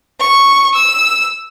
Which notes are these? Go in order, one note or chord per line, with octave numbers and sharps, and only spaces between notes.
C#6
E6